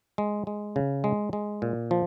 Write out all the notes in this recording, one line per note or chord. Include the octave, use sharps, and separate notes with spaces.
G#3
G#3
C#3
G#3
G#3
A#2
F3